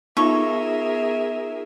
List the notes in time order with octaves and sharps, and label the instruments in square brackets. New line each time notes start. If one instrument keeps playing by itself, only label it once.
[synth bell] B3 D#4 F4 [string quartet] G#4 A#4 E5 [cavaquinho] C#6